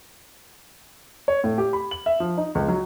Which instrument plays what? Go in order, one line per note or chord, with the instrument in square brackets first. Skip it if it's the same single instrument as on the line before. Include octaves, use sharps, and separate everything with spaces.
[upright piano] C#5
A2
G4
B5
F#7
E5
F3
D#4
C#2
F#3